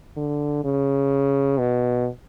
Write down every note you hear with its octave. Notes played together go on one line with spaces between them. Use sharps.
D3
C#3
B2